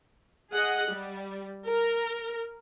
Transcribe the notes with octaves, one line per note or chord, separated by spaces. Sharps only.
G#4 D#5 F#5
G3
A#4